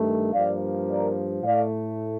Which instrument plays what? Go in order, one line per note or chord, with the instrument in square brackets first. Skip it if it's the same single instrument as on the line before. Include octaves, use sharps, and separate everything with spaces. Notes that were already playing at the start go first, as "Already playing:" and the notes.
Already playing: [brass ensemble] G2 D#3 A3
G2 F3 A#3 D5 F5
A#4 D5
A2 A3 D5 F5